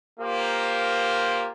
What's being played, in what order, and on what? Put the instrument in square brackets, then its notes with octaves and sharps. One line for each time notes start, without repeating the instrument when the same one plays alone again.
[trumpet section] A#3 F4 G4 A#4 C5